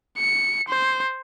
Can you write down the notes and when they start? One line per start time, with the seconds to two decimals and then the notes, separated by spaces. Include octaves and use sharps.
0.18 C#7
0.69 C5